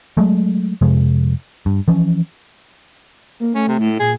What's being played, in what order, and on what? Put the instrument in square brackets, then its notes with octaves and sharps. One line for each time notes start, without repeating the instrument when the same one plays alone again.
[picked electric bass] F#3 G#3 A3
F2 C3 F3 G#3
G2
E3 F3 C#4
[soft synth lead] A#3
[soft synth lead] A3 [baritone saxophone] C#4
[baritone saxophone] C3
A2
[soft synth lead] A#2 [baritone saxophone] G#4